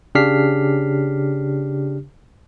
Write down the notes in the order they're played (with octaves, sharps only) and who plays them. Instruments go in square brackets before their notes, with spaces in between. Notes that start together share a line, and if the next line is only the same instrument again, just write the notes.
[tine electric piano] C#3 D4 G4 F6 B6 C7